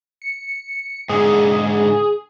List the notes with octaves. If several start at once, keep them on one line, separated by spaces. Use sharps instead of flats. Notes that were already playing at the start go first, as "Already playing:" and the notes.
C#7
G#2 D3 G#4